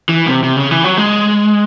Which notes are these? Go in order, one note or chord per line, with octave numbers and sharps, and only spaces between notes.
E3
C3
C3
C#3
E3
F#3
G#3